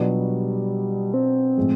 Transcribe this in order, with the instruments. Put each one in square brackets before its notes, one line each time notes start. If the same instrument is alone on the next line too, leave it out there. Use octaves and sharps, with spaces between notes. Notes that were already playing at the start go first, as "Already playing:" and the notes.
Already playing: [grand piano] B2 F#3 B3 D4 F4 [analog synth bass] G3
[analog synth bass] C4
[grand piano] A2 F3 G#3